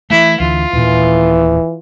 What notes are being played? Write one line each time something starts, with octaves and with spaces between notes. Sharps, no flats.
E3 A3 E4
D2 E3 F4
D#1 A#2 E3